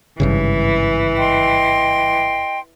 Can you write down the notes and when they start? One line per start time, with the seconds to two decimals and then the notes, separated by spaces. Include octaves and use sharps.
0.20 G#1 G2 C#3 E3
1.17 D#5 G5 C6